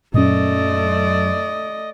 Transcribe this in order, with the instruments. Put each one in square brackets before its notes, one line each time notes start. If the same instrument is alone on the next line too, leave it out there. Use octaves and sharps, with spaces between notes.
[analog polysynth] F#2 [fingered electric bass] A#2 C#4 [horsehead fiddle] A3 D5 [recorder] D#5